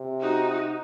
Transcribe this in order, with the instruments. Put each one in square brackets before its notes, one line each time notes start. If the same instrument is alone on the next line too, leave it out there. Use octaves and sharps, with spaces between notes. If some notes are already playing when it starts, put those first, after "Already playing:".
Already playing: [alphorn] C3
[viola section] D#4 F#4